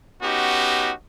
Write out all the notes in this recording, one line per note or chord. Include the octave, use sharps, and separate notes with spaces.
B3 C#4 D#4 F#4 G4